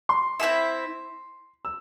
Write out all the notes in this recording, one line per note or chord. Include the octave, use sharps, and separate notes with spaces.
C6
C4 E4 G#4 E5
E6